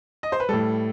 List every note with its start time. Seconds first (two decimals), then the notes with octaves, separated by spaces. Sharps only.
0.23 D#5
0.32 C5
0.40 B4
0.49 A2 G3 A4